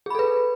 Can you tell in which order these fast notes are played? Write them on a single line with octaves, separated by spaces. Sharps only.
G#4 B5 A4 B4